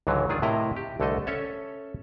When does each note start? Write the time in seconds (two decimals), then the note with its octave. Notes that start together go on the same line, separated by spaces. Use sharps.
0.07 C#2 G#2 D3 E3 F#3
0.29 D#3 D4 F4 G#4
0.42 A2 C3 E4 A#4 D#5 A#5
0.76 G4
1.00 C2 D3 A3 A4 D#5
1.27 C#4 A4 C#5 E5